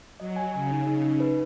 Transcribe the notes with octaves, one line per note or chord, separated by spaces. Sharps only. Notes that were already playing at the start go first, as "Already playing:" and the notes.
F#3 D#5
G#5
C#3 G#5
D#4
C#3 D#4
D#4
B4